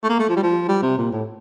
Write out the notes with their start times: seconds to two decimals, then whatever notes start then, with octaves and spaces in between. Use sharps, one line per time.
0.04 A3
0.10 A#3
0.20 A3
0.29 F3
0.37 G3
0.43 F3
0.69 G3
0.82 C3
0.98 A#2
1.12 A2